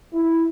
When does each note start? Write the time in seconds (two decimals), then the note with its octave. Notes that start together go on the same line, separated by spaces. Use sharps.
0.14 E4